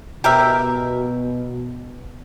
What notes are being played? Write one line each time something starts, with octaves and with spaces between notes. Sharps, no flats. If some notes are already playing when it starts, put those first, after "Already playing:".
B2 G4 A#4 E5